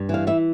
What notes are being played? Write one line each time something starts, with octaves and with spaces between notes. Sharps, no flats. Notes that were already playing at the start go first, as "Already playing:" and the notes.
Already playing: G2
E3 F5
E3 E5